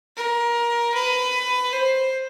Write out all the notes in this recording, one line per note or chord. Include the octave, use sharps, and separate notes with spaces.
A#4
B4
C5